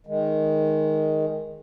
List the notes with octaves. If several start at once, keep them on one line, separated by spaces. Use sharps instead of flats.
D#3 G#3